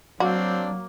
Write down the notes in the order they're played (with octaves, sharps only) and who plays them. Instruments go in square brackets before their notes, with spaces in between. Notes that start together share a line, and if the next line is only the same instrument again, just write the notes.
[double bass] F#3 [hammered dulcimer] A#3 [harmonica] C4 D4 [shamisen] F#4